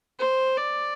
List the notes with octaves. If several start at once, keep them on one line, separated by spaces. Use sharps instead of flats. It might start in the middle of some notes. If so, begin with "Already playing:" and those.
C5
D5